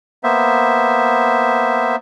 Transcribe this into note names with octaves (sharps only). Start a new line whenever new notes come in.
A#3 B3 C5 E5